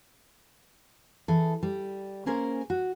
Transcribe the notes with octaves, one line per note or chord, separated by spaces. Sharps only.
E3 G#4 A4
G3
A#3 C#4 G#4 A#4 C5
F#4